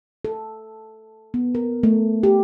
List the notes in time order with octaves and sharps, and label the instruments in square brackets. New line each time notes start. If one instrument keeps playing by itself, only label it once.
[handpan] A4
B3
A#4
A3
G4